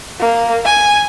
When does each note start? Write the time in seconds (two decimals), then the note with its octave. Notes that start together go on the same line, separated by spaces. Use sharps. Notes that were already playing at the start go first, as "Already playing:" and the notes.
0.20 A#3
0.65 G#5